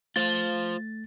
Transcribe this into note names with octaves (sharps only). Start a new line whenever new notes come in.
A3 F4 C5 A6